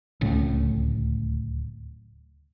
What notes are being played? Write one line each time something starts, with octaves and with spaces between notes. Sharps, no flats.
D1 C#2 A2